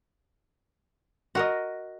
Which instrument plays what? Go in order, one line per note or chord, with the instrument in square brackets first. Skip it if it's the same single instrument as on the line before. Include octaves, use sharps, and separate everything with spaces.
[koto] F#4 A#4 D#5